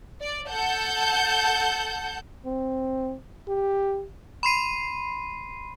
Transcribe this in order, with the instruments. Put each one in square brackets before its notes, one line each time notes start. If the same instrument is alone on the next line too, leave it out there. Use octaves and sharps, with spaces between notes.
[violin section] D5
A4 F#5 A5 G6
[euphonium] C4
G4
[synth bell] B5 C6 C7 D#7